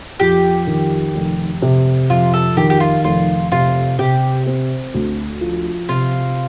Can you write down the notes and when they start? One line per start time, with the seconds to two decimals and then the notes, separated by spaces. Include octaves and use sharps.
0.20 F2 G4
0.67 D#3
1.15 F1
1.62 C3
2.10 F2 F4
2.34 A4
2.57 D#3 G4
2.70 G4
2.80 F4
3.04 F1 F4
3.52 C3 F4
3.99 C3 G4
4.46 C4
4.94 D2
5.41 F3
5.89 C3 F4